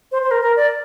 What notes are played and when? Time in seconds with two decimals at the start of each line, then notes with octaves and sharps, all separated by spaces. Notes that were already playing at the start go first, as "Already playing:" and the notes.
0.12 C5
0.22 C5
0.31 A#4
0.41 A#4
0.56 D5